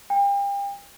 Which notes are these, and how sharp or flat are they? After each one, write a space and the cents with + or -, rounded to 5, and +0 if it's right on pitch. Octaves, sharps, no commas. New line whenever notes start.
G5 +35